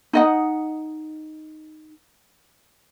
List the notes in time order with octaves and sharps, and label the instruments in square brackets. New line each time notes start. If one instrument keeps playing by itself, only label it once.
[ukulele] D#4 D#5 F#5